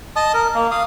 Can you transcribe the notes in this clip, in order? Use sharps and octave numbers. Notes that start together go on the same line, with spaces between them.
D#5 A5 D#6
A#4
A#3
F5 D#6